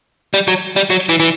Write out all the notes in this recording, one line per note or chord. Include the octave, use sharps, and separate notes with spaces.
G3
F#3
G3
F#3
E3
E3